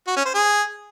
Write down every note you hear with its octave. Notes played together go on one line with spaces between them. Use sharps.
F#4
C#4
C5
G#4